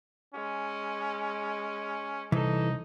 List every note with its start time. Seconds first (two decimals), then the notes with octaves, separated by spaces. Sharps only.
0.34 G#3 C#4
2.32 C2 E3 D#4 A4